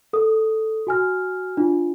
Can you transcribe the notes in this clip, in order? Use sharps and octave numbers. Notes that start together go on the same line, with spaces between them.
A4 D#6
F#4 G#5 F6
D4 F4